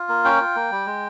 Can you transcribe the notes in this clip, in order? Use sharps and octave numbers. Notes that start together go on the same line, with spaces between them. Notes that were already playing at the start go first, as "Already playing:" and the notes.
Already playing: F4
A#3
C#4 G5
F4
A#3
G3
G#3